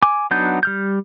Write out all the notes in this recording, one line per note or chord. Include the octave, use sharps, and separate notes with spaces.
G#5 D6
F#3 B3 D4 D#4 G6
G3 F6 G6